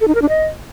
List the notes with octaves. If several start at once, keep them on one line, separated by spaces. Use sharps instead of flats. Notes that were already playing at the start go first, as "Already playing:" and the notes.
A4
D#4
A#4
D4
D#5